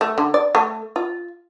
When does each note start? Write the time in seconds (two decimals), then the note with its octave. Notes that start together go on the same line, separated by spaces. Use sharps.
0.01 A3
0.18 D3
0.34 D5
0.55 A3
0.96 F4